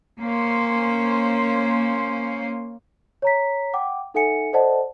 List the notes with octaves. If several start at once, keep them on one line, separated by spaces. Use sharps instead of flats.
A#3 C#4 C5
C#5 A#5 B6
F#5 G5 D6
D#4 A4 E5 F#5 G#5 C#7
A4 C5 D5 D#5 F#5 A5